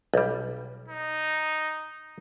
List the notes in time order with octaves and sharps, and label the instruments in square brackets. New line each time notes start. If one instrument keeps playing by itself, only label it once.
[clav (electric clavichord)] B1 G3
[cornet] D#4